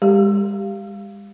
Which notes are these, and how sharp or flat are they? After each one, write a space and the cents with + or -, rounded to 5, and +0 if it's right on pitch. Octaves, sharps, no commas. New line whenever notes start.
G#3 -45 G4 +0